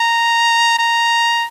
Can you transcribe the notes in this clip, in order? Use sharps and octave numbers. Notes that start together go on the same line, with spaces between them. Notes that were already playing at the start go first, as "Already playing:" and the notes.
Already playing: A#5
A#5